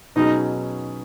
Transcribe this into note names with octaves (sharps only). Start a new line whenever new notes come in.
B2 F#3 C#4 D#4 G#4